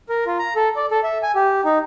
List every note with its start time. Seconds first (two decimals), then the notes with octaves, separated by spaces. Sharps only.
0.09 A#4
0.27 F4
0.39 A#5
0.56 A4
0.76 D5
0.91 A4
1.03 E5
1.23 G#5
1.35 G4
1.65 D#4